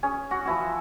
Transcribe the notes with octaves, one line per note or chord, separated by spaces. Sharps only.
C#4 G#4
F#4
F3 E4 F#4